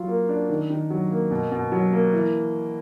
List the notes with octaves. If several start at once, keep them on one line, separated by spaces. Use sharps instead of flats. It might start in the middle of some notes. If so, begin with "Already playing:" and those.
Already playing: F#3 F4
A#3
D4
D#3
D#3
F#3
A#3
B2
B2
F#3
A#3
E3